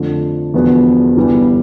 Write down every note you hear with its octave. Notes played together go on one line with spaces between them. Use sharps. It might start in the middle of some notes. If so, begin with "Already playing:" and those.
Already playing: F2 D3 F3 A3
E1 E2 D3 F3 B3
G1 G2 E3 G3 B3